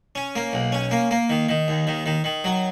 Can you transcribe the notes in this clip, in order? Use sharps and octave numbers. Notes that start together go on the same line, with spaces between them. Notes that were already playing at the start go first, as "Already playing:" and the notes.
C#4
A#3
B1
C#4
A#3
A#3
D#3
D#3
D#2
D#3
D#3
D#3
F#3